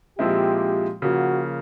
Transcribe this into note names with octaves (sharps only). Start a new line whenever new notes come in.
A#2 F3 G#3 C4 E4 G4
C#3 F3 A#3 F#4